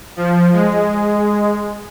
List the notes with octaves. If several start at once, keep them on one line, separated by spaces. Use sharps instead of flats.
F3
G#3